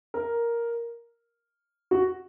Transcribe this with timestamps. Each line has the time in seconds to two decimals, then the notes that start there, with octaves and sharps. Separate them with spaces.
0.14 A#4
1.91 F#4